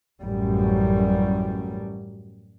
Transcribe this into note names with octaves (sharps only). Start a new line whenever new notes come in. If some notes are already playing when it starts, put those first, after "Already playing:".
A1 F#2 G3